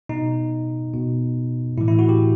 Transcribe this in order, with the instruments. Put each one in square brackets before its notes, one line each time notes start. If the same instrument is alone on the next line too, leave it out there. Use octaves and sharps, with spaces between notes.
[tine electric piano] B2 D#4
B2
A2 E4
E3
E4
F#4
G4